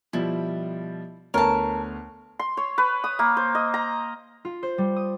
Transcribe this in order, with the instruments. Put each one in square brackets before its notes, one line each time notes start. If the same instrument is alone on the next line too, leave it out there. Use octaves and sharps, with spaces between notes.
[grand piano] B2 F3 G3 [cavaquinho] E4
[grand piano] D2 B3 C#5 [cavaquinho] A#4 A5
[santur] C6
C#5
B4
D#6
A#3
C5
D#5
A#5
[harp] F4
C5
G3
D#6